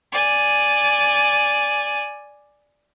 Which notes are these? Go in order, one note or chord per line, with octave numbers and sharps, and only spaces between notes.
D5 G#5